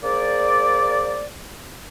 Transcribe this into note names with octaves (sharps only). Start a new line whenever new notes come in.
A#3 G#4 C5 D5